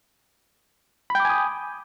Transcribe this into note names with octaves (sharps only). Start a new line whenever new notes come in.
G5 G#5 B5 D6 D#6